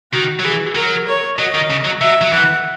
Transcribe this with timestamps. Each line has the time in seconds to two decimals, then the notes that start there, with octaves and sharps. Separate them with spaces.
0.13 D#3 F#4
0.39 F#3
0.44 E3 G#4
0.75 F#3 A#4
1.07 C#5
1.38 F#3 D#5
1.54 D#3
1.70 C#3
1.85 F#3
2.01 F#3 E5
2.21 F#3
2.32 E3 F#5